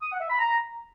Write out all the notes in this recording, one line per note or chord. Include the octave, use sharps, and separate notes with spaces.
D#6
F#5
E5
B5
A#5